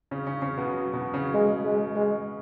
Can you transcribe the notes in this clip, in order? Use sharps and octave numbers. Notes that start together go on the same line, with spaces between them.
C#3 C#4
C#3 C#4
C#3 C#4
B2 B3
F#3
B2 B3
C#3 C#4
G#3
G#3
G#3